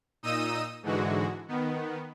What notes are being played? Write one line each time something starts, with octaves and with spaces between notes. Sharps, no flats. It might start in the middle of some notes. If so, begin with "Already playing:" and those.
A#2 D#4 D#5 D#6 E6 D#7
G#2 D3 E3 G#3 F#4
D#3 B3